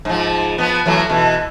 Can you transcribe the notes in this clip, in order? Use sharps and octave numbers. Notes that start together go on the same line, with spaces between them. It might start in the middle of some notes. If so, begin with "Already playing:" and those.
G#2 F3
F3 B3
E3 F#3 A3
B2 E3